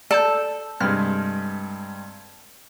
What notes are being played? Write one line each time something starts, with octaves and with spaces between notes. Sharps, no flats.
A4 D5 A5 G6
G2 C3 G#3 F6